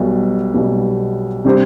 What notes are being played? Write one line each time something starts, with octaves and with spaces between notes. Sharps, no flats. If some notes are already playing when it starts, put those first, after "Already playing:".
Already playing: B1 B2 G3
B1 B2 G3
C3 G3 D4 G4 C5